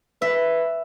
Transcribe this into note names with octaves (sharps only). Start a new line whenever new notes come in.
B4 E5